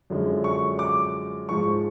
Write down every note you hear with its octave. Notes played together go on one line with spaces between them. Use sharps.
F#2 D3 F3 G#3
C#6
D6
G#2 F3 G#3 C#6